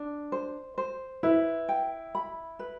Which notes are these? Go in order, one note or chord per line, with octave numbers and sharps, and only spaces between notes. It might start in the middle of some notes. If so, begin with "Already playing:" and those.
Already playing: D4
C5
C5
E4 B4
G5
B5
B4